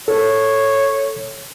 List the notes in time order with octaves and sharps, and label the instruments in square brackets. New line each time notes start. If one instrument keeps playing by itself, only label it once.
[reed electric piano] A4 [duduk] C#5